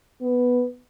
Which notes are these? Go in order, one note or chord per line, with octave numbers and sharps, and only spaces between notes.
B3